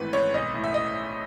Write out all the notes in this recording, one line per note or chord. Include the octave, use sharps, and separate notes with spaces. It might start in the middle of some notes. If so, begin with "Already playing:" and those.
Already playing: G#1 E3 A3 B4
G#1 C#5
B1 D#5
A2
E5
D#5